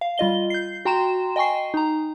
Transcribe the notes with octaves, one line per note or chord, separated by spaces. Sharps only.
F5
G3 F4 D#5 G7
G6 C7
F#4 G5 A#5 C6 E7
D#5 G5 G#5 C#6 C7
D#4 A#5